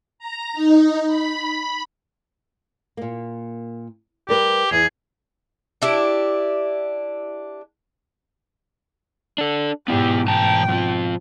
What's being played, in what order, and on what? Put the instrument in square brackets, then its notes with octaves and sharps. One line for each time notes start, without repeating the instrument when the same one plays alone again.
[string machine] A#5
D#4
B5
[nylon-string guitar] A#2 A#3
[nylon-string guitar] G3 A#4 B4 [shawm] G4
[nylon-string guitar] E2 E3 [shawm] G#4
[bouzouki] D4 E4 G4
[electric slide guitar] D4 A4
[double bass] G#2 B2 [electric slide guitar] B3 E4 [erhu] G4
[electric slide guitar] E3 A5 A#5 [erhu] G5
[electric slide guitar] F2 F3